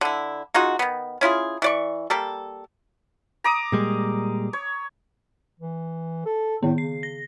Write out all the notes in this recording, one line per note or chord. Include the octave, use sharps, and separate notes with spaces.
D3 E4
G#3 D#4 F4 F#4
D#3 B3
C#4 E4 F4 G#4
E3 D5 C#6
G3 A#3 A4
A#5 D6 D#6
A#2 G3 G#3
C#5
E3
A4
A2 D#3 B3
C#3 C7
A#6